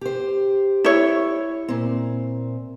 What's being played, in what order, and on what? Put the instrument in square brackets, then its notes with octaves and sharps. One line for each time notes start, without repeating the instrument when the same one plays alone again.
[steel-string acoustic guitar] G4 C5
[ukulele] E4 C#5
[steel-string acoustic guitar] A#2 C4